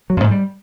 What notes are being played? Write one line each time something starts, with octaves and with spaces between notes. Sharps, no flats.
F#3
F2
G#2
G3